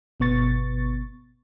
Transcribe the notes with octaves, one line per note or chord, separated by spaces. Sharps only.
G1 B2 B3 C#6 A6